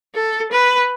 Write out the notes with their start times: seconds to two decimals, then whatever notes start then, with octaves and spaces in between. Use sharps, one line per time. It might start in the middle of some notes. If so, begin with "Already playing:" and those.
0.14 A4
0.52 B4